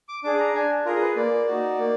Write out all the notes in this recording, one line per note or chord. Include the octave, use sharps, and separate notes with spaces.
D6
D4 G#4 D6
A#5
D4 G#5
F4 G#4 A#4
B4
A#3 D5
D#4 F#4
A#3